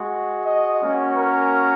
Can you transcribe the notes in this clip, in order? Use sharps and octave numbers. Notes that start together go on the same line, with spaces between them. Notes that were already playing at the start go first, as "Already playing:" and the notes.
Already playing: G#3 F#4
D#5
A#3 C#4 F#4
A#4